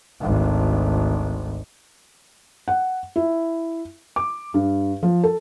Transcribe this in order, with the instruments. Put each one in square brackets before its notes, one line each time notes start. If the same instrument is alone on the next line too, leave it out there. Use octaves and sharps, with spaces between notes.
[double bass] G#1 D2
[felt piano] F#5
E4
D6
G2
F3
A4